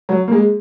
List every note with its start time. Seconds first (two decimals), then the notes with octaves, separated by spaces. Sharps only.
0.09 F#3
0.28 A#3
0.32 G#3